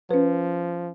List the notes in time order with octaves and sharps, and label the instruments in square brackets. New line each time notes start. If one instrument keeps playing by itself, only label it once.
[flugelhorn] F3 [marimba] C#4 B4